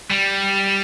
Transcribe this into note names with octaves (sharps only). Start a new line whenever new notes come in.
G3